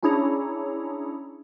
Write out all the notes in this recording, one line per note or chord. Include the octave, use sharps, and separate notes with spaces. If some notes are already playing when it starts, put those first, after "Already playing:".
C#4 D4 E4 G#4 C#5 A#5